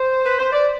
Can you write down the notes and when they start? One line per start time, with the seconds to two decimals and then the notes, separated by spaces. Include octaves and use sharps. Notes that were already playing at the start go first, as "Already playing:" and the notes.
Already playing: C5
0.26 B4
0.39 C5
0.53 D5